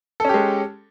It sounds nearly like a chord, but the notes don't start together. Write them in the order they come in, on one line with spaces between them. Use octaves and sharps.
A4 C#4 G4 G#3